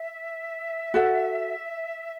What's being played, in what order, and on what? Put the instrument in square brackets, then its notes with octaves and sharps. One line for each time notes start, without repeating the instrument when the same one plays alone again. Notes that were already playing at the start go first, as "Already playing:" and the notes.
Already playing: [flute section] E5
[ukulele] F#4 A4 F#5